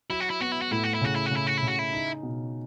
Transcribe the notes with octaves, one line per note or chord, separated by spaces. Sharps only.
F#3 E4
F#4
E4
B3 F#4
E4
F#4
A2 E4
F#4
E4
C#3 F#4
E4
F#4
C#3
E4
F#4
C#3 E4
F#4
E4
D#4
B2